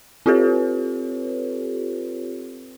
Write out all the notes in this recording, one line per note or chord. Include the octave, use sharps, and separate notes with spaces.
C4 F4 G4 A4 B4 C#5